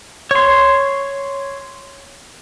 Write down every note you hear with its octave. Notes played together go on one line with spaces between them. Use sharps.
C#5 C6